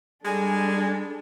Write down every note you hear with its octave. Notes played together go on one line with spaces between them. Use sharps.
G3 G#3 D4 A4 G#5